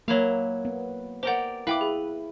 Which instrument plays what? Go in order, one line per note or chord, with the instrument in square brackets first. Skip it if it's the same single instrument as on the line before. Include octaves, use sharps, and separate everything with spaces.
[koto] F#3 E4 F5 [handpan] A#3
[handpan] B3
[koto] G4 A#4 D5 [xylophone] C5 F#5
[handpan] E4 [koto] B4 [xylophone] F5 G5 D6
[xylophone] G#4